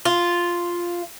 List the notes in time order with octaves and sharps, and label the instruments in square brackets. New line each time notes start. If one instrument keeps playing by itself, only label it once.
[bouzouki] F4